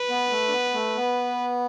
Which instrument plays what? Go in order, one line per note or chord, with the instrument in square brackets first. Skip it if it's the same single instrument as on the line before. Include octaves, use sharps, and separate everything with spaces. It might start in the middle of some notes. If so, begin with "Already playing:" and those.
Already playing: [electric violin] B4
[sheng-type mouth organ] B3
A3
D4
B3
A3
B3